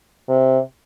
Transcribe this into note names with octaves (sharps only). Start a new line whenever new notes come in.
C3